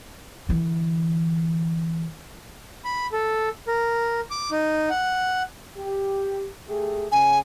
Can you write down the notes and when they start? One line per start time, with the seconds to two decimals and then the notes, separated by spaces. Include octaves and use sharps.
0.48 D3 E3
2.84 B5
3.12 A4
3.68 A#4
4.31 D6
4.52 D#4
4.90 F#5
5.78 G4
6.69 A3 G4 G#4
7.12 C#3 G#5